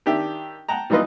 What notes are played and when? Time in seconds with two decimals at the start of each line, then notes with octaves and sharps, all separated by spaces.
0.06 D#3 D4 G4 E5 G5
0.69 F#5 G5 A5 A#5
0.90 E3 G3 D#4 F4 B4 D#5